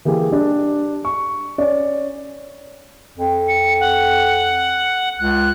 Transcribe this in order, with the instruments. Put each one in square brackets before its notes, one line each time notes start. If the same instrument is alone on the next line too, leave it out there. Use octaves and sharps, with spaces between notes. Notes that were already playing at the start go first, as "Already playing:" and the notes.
[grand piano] E3 A#3 G4 G#4
G3 D4
C#6
C#4 D5
[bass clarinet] F2
[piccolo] C#7
F#5
[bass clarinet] C#2 [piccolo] F#6